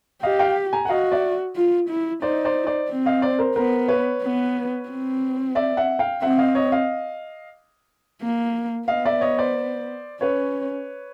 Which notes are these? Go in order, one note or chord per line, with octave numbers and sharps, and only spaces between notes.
G4 D#5 F5
F5 G5
G#5 A#5
F#5
F#4 D#5 F5
D5 E5
F4
E4
D#4 C5 D5
C5 D5
C5 D5
C4
D#5 F5
C5 D5
A#4 C5
B3 A#4 C5
B4 C#5
B3
C4
D5 E5
E5 F#5
F5 G5
C4 E5 F#5
D#5 F5
C#5 D#5
D#5 F5
A#3
B3 D#5 F5
D5 E5
C#5 D#5
C5 D5
C#4 B4 C#5